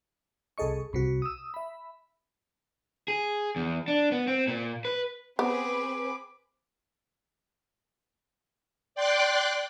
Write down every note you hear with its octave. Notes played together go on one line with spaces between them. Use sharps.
C2 G#4 A4 D#5 C#6
C2 C3 F#4
D#6 E6
E5 B5
G#4
E2
D4
B3
C4
A#2
B4
B3 C4 G#4 B4 D6
D5 G5 C6 D6 F#6